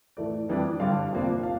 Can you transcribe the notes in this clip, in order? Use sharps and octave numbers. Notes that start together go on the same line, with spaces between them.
A2 E3 A3 D5
F2 E3 G3 D4
G2 D3 G3 D4 F5
F2 C3 F3 A#3 D4
D4 F5